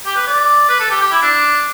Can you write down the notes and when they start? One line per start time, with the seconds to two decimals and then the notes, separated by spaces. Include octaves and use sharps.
0.06 G4
0.16 B4
0.27 D5
0.69 B4
0.80 A4
0.90 G4
1.01 G4
1.12 E4
1.22 D4